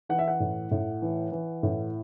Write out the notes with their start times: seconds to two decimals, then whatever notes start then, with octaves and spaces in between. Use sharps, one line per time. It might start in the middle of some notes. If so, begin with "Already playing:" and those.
0.09 E3 F#5
0.19 E5
0.28 F#5
0.40 A2
0.71 A2
1.02 E3
1.32 E3
1.63 A2